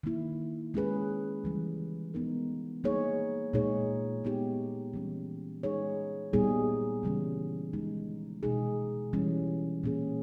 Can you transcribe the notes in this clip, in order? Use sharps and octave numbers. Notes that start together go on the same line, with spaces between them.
D#3 A#3 E4
G#3 C#4 G#4 B4
C#3 E3 G3
G#3 B3 D#4 A#4
G3 A#3 D#4 G#4 C#5
A#2 G#3 D#4 G#4 C#5
G#3 B3 D#4 G4
E3 G3 C#4
G#3 D#4 G#4 C#5
A#2 G3 B3 D#4 G#4
C#3 E3 G3 C#4
D#3 G#3 D#4
B2 G#3 D#4 G#4
E3 G3 C#4
A#2 A#3 C#4 G#4